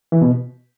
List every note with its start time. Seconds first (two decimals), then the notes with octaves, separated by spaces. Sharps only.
0.12 E3
0.22 B2